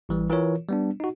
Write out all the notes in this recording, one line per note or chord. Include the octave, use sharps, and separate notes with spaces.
A1 E3 G3
E3 F4 A#4 C#5
G3 B3 D4
D#4 F#4